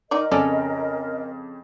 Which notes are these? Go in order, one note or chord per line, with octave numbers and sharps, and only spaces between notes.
D#3 D#4 A#4 D5 D#5
F2 C#3 C#4 A4 D5 D7